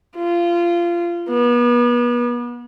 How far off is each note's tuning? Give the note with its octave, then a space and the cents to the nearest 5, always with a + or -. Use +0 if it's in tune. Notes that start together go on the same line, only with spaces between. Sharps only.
F4 -20
B3 -35